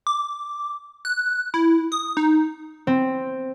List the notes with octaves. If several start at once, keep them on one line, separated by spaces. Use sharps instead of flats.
D6
F#6
E4
D#6
D#4
C4